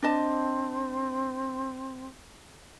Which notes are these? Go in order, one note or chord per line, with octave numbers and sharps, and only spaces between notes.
C4 D4 D#5 A5